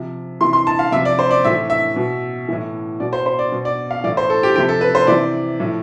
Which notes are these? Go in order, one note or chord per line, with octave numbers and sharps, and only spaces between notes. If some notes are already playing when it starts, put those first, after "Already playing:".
Already playing: C3 F3
C3 E3 C6
C6
A5
F5
C3 F3 E5
D5
C5
D5
A2 E3 E5
E5
B2
A2 E3
B2 D5
C5
C5
D5
B2
D5
F5
A2 E3 D5
C5
A4
G4
C3 F3 G4
A4
B4
C5
C3 E3 D5
A2 F3